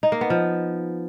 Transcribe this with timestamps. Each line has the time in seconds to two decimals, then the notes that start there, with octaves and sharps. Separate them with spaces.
0.03 D#4
0.12 A#3
0.21 B3
0.30 F3